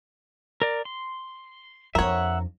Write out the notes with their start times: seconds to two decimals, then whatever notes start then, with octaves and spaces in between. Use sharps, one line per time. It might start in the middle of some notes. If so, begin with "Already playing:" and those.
0.62 A#4 D5
0.85 C6
1.95 F2 D4 A#4 C#5 E5 F#5